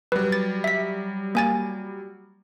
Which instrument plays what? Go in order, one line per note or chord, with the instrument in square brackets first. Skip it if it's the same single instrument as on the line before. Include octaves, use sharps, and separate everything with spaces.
[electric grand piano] F#3 G3 [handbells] B4
[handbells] A6
E5 B6
A#3 G#5 A6